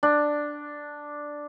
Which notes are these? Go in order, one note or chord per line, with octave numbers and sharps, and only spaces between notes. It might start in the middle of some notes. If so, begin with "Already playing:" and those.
D4